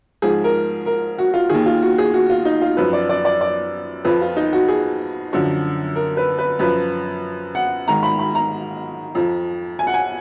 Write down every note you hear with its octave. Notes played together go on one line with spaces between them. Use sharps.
G#2 F3 G#4
A#4
A#4
F#4
F4
D#2 D#3 G#4
F4
F#4
G#4
F#4
F4
D#4
F4
F#2 F3 B4
D5
D5
D5
D5
F2 F3 B4
F4
D#4
F#4
G#4
F#2 D3 F3
A#4
B4
B4
F#2 F3 B4
F#5
G#2 D#3 A#5
B5
B5
A#5
F2 F3
G#5
F#5
G#5